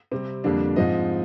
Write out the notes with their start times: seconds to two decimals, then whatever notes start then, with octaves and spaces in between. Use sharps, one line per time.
0.12 C3 G3 C4
0.44 F2 D3 G3 A#3 D4
0.76 G#2 F3 C4 D#5